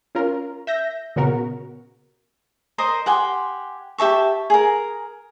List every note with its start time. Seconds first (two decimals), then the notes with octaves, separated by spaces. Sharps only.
0.15 C#4 F4 A#4
0.67 E5 G6 A#6
1.16 A#2 C#3 B3 F#4 A#4
2.78 A#4 C5 D#5
3.06 G4 F#5 G#5 C6
3.98 G4 E5 A5 C#6
4.50 G#4 A#4